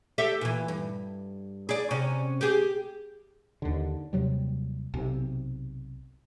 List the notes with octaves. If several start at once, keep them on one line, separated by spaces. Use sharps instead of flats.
G4 A4 E5
A#2 E3
G2
G#4 D5
C3 C#4
G4 G#4
D#2 D3
D#2 C3 F#3 G3
B1 C3